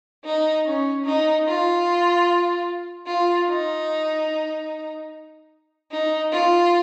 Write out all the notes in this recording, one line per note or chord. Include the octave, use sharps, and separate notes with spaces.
D#4
C#4
D#4
F4
F4
D#4
D#4
F4